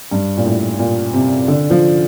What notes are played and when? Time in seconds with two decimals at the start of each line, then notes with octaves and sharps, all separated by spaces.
0.11 G2
0.37 A#2
0.45 A2
0.79 A#2
1.13 C3
1.48 D3
1.70 F3